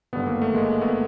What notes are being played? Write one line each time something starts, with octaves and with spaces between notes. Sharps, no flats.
G#1 G2 D3 B3
A#3
A3
G#3 A#3
A3 B3